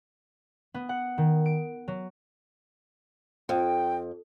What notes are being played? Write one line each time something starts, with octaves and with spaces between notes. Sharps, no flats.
B3
F#5
D#3
D7
F#3
F2 G5